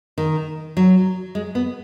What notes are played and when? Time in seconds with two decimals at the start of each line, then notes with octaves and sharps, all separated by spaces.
0.18 D#3
0.77 F#3
1.35 G#3
1.55 B3